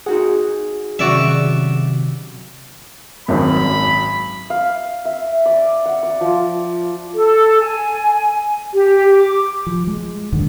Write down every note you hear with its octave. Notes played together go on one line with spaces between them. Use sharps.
D#4 F#4 G#4 F#5
C3 D#3 F#3 C#4 F#4 D5 E5
G#1 F#2 B5
F5
E5
D5
F#5
D5
F3
A4
G#5
G4
D6
F3
G#3
D#1 F#2 D3 D#3